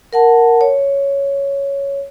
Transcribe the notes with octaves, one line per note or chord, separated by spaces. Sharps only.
A#4 F#5 A5
C#5